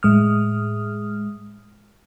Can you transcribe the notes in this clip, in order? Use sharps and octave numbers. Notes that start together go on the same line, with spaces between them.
A2 G#3 D#6 F6